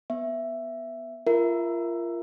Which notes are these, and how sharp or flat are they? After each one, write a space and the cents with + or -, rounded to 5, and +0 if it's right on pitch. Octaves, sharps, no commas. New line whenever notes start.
B3 +0 E5 +10
F4 -25 A#4 +0 E5 +5